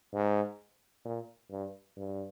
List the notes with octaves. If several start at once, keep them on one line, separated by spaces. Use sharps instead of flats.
G#2
A#2
G2
G2